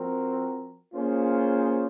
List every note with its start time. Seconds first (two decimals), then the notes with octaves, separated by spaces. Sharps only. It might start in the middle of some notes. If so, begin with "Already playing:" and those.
Already playing: F3 C4 F#4 A#4
0.94 A#3 C#4 F4 G#4 C5